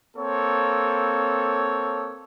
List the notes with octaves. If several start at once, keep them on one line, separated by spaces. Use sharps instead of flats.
A#3 C4 A4 C#5